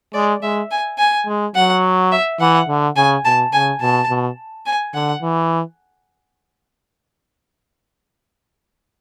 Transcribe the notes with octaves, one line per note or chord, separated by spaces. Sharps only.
G#3 D5
G#3 E5
G#5
G#5
G#3
F#3 F#5
E5
E3 F#5
D3
C#3 G#5
B2 A5
C#3 G#5
B2 A5
B2
G#5
D3 F#5
E3